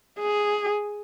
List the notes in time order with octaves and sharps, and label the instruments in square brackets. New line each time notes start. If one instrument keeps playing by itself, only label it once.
[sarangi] G#4